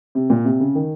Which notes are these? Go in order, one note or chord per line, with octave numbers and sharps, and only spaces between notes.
C3
A#2
C3
C#3
D#3